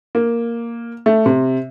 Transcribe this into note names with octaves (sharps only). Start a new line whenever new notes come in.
A#3
A3
C3